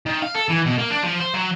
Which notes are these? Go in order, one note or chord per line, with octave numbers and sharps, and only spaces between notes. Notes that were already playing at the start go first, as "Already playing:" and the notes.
D#3
F5
A4
E3
B2
A#3
D4
F3
C5
F#3